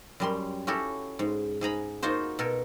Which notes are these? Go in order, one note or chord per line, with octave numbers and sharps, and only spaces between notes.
F#2 G3 C6
C#4 E4 F#4 G4 A4
G#2
G#2 G#4 A#5 B5
A#3 D#4 F4 F#4 C5
B2 A4 A#4